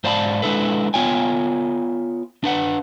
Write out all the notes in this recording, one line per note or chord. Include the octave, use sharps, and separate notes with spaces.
G#2 C5 D5 F5 A5 B5
G#3 D4 E4 A4 B4
B3 F4 C#5 G5 G#5
D4 B4 F#5